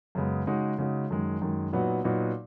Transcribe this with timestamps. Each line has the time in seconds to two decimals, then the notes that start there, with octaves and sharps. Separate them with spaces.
0.15 F#2 C#3 G#3 B3
0.47 C#3 G#3 D#4 F#4
0.78 C#3 G#3 D#4 F#4
1.10 F#2 D#3 G#3
1.42 F#2 D#3 G#3
1.73 A#2 F#3 B3 D#4 F#4
2.04 A#2 F#3 B3 D#4 F#4